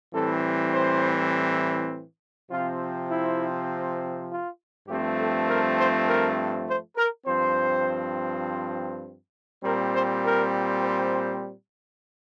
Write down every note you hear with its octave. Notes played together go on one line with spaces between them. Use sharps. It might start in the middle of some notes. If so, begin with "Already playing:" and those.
A2 E3 G3 C4 A4
C5
C3 F3 C4 F4
E4
F4
G2 F3 A3 C4 G4
A4
A#4
C5
A#4
C5
A#4
G2 F3 C4 C5
A#2 G3 C4 A#4
C5
A#4
C5